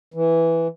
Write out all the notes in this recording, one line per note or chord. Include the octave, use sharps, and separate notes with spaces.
E3